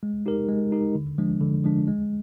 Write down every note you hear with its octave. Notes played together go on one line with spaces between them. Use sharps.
G#3
D#4 G4 A#4
G#3
D#4 G4 A#4
D3
F3 G#3 D4
D3
F3 G#3 D4
G#3